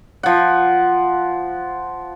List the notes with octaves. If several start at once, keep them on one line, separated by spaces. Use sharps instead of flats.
F3 F#5